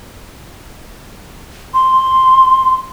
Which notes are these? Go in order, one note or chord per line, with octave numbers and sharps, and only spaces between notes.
C6